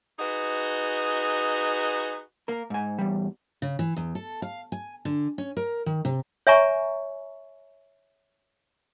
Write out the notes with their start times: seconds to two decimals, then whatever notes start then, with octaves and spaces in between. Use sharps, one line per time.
0.19 D#4 F#4 G#4 B4 D#5
2.48 A#3 A#4
2.70 G#2 G#5
2.98 E2 G3
3.62 C#3
3.79 E3
3.97 E2
4.15 A4
4.42 F5
4.72 G#5
5.05 D3
5.38 C#4
5.57 A#4
5.86 D#3
6.05 C3
6.47 C#5 E5 G#5 A#5 C#6